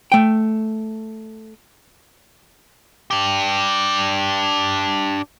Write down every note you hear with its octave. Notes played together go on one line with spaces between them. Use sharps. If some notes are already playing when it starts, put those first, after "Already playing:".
A3 G5
D4 G4